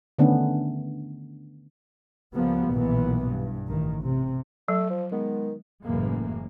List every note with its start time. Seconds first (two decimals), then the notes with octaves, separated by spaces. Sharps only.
0.19 D3 D#3 A3 B3 C#4 D4
2.34 C#2 F3 G3 A#3 B3
2.71 B1 A#2 D#3 E3 B3
3.27 G2
3.66 A1 D#3
4.03 C3
4.68 F#3 A3
4.90 F3
5.12 D#3 G#3 B3
5.83 F#1 F#2 A2 E3 G#3 A#3